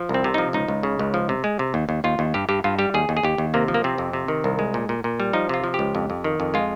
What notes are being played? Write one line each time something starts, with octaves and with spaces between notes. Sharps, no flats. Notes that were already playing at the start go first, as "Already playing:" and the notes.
Already playing: F3
C2
C4
C3
F3 D#4
C#2 D#4
C#2
C#3
C#2
F3
C3
G#3
C3
D#2
D#2
D#2 F4
D#2
G2 G4
G2 G4
G2 F4
G3 G4
D#2 G#4
D#2
G#4
D#2 G4
D#2
C3 A#3
F3
A#3
C3 C4
F2
C3
D#3
C2
G#3
A#2
A#2
A#2
G3
F3 D#4
C3 F4
F3
G4
C#2
F2
F2
D#3
F2
G#3 F4